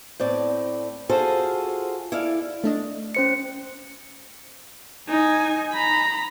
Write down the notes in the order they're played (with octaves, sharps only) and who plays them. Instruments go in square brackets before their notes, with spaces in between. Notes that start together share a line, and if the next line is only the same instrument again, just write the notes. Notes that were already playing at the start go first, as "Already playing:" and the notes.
[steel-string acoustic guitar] A2 C4 D5
F4 F#4 G#4 A4 C5 F5
E4 A4 D5 F5
[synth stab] A3 D4 D#5
[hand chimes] C#4 C5 C#7
[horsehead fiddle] D#4 G#5
A#5 B5